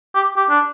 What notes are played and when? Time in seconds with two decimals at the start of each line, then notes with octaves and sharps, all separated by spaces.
0.15 G4
0.37 G4
0.50 D4